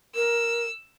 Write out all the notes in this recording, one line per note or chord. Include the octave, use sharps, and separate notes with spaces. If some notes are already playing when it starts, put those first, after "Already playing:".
A#4 E6